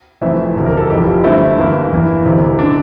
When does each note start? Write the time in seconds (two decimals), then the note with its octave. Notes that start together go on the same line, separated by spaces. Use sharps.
0.21 F1 F2 E3 A3 C4 E5
0.56 E1 D2 C3
0.66 A#4
0.77 A4
0.90 F1 F2 E3 G4
1.07 F4
1.24 G2 D3 A3 C4 E4
1.58 G1 G2 E3 A#3
1.91 E2 E3 A#3
2.25 E1 D2 C3 E3
2.59 D3 D4